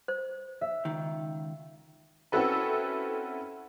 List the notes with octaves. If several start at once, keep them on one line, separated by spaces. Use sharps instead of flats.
C5
E5
C#2 D#3
C4 C#4 E4 F#4 A4 B4